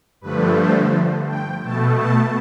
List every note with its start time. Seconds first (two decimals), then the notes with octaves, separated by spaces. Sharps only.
0.21 G2 D3 F3 A3 B4
0.57 C5
1.27 G5
1.63 B2 A3 A5
1.97 A5